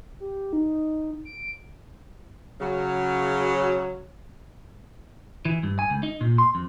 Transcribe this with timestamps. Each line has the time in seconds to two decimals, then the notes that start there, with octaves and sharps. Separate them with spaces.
0.20 G4
0.53 D#4
1.25 D7
2.61 C#3 F#3
5.45 E3
5.63 G2
5.79 G#5
5.90 C#2
6.03 D#4
6.21 A#2
6.38 C6
6.55 F2